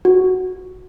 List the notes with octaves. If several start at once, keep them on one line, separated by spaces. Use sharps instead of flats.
F#4